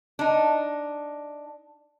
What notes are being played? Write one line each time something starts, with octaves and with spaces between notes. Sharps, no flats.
D4 D#4